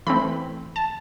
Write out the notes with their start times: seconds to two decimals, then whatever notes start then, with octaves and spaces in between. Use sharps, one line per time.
0.07 E3 A3 C4 B5
0.76 A5